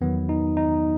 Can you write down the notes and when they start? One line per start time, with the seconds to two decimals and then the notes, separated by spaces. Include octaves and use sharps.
0.01 E2 D#3 F#3 B3
0.29 D#4
0.57 D#4